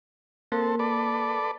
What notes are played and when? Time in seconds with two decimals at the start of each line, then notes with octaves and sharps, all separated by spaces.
0.52 A#3 C4 A4
0.79 A4 B4 D5